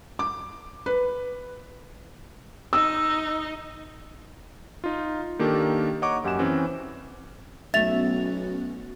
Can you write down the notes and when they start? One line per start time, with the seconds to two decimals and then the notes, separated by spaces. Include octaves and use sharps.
0.19 D6
0.86 B4
2.73 D#4 E6
4.84 D#4 F4
5.39 D#3 A#3 D4 G4 A4
6.02 C#5 D#5 F#5 A#5 C#6 D6
6.24 F#2 G4 F#5 G#5 E7
6.39 E3 C4 C#4
7.74 B1 A3 B3 C#4 F#4 E5 A6 F7